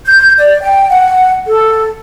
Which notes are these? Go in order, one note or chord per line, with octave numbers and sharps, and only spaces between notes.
G6
D5
G5
F#5
A4